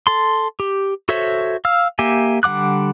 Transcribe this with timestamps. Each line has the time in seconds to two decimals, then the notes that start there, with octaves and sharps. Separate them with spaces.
0.07 A4 C6
0.60 G4
1.09 F#4 A4 C5 C#5 E5
1.65 F5 E6 F6
1.99 A#3 G4 E5 G#5
2.43 D3 G3 F#5 D6 F#6